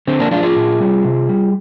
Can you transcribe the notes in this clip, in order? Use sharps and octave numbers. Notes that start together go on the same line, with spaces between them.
D3 C4
A#3 D4
F3 G#3 D4 F4
F4 G#4
A#2
G3
C3
G3